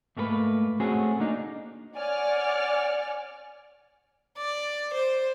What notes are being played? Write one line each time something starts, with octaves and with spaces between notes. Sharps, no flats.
G#2 A3 A#3 G4 B4
A3 C4 C#4 F#4 G#4
A#3 D4 D#4
C#5 D5 F#5 G#5 F6
D5
C5